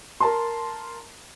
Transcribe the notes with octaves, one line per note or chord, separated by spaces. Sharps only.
A#4 A5 C6